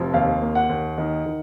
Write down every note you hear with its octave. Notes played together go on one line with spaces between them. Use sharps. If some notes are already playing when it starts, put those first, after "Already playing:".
Already playing: F1 F3
D#2 F5
A#3
F#5
D#2
D#3
D#3